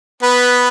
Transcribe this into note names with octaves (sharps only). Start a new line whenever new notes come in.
B3 B4